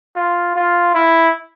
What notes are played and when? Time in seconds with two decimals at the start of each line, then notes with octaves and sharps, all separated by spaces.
0.16 F4
0.56 F4
0.94 E4